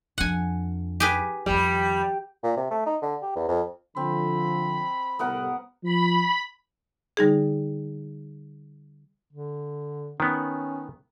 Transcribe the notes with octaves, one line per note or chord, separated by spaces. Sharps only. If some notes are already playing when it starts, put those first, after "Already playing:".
F2 D4 F#5 G#5
G4 G#4 B4
F2 D#3 G3
A#2
C3
A3
D#4
D3
G4
E2
F2
D3 F3 C4 B5
C2 A2 G3 B3 A#4 F#5
F3 B5
D3 G3 D#4 G#4
D3
D#3 B3 C#4